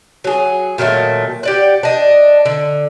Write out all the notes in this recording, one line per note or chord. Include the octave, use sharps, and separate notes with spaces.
F#3 G#4
A#2 D#3 F#3 A3
G4 D5 F#5
D4 D#5
D3